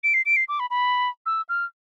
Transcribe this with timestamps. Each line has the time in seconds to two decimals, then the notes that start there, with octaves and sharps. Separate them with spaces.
0.04 D7
0.14 C7
0.26 D7
0.36 C7
0.48 D6
0.60 B5
0.70 B5
1.26 E6
1.49 F6